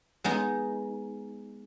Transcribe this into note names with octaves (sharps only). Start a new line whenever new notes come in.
G#3 B3 D#4